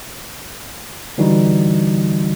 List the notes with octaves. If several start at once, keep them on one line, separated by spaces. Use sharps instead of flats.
D3 E3 G3 D#4 F#4